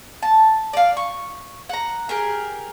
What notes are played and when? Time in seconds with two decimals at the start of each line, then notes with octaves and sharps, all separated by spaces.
0.23 A5
0.73 D5 F5
0.97 C#6
1.69 F#5 A#5
2.09 G4 G#4 A#4